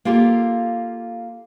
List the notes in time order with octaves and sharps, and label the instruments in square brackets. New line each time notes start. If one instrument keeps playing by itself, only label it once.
[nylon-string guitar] A#3 F4 G4 A4